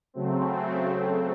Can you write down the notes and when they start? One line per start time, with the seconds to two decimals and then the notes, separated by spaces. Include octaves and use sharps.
0.14 C#3 F#3 A3 C4